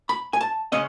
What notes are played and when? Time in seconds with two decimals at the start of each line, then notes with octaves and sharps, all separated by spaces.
0.09 B5
0.33 G#5
0.41 A5
0.72 C#3 G#3 C#4 D#5